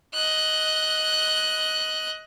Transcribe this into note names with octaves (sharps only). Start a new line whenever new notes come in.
D#5 F#6